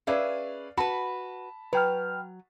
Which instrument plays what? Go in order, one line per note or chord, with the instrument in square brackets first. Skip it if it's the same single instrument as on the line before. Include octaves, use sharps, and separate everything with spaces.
[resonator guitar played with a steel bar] C#4 G#4 E5 [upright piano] B4 D5 F5
[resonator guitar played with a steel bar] F#4 B4 [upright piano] A5 B5
[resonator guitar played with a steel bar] F#3 [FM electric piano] B4 G5 F6